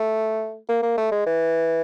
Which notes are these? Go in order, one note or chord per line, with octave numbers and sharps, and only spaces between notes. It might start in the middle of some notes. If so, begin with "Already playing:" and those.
Already playing: A3
A#3
A#3
A3
G#3
E3